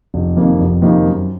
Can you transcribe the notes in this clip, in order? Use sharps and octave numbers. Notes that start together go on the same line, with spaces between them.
F1
F2 C3 D#3 A#3
F1
F2 C3 D#3 A#3
F#2